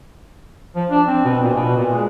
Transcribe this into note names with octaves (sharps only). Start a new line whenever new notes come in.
F3
D4
C4
B2
A#2
B2
A#2
G#3